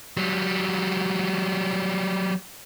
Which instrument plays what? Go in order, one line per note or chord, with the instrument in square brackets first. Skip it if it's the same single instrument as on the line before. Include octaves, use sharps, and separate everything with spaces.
[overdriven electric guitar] F#3 G3